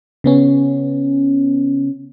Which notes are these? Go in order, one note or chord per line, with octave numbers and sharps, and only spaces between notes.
C#3 B3 C#4